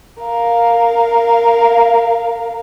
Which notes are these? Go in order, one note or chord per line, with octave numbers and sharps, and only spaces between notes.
A#4 F5